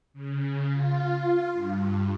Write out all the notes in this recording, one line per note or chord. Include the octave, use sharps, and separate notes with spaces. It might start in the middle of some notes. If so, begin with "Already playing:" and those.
C#3
F4
F4
G2